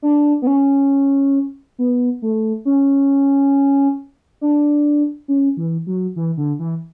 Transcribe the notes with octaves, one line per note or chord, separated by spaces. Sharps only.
D4
B3
C#4
B3
A3
C#4
D4
C#4
E3
F#3
E3
D3
E3